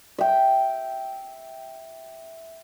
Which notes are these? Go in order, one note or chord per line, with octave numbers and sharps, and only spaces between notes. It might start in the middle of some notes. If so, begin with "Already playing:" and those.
E5 G5